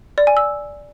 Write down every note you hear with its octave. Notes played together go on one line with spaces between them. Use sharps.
D5
G#5
E6